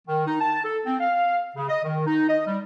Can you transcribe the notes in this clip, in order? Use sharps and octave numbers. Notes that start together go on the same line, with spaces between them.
D#3
D#4
A5
A4
C4
F5
C#3
D#5
D#3
D#4
D#5
G3